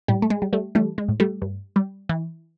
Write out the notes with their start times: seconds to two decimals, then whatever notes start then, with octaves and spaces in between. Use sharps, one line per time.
0.08 A2 G3
0.22 A3
0.30 G#3
0.42 G3
0.53 G3 A3
0.75 E3 G3 A3
0.98 G#3
1.08 A2
1.20 G3 A3
1.42 G2
1.76 G3
2.09 E3